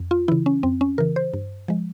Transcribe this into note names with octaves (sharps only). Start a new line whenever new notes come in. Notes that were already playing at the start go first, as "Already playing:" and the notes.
Already playing: F2
F4
C#3 E3 E4
C#4
F2 C4
C#4
C#3 E3 A#4
C5
G2
F3 G#3